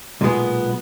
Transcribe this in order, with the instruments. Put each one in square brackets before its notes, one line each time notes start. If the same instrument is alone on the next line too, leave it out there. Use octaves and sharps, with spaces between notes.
[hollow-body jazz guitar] B1 A#2 G#3 B3